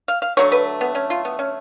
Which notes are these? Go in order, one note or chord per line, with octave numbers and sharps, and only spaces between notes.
F5
F5
D3 F#3 A3 C#5
B4
B3
C#4
F4
B3
C#4